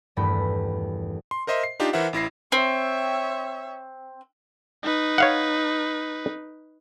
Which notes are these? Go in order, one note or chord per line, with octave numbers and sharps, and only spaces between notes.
D#1 E2 G2 A3 G5 B5
C6
A#4 C5 D#5 E5 C6
C7
D4 D#4 F4 G4
E3 A#4 C5 E5 F#5
A1 E4 A#6 C7
C4 C#5 E5
D#4 B4
C#5 F5 F#5